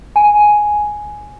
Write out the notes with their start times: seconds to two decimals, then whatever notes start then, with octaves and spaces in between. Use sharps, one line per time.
0.16 G#5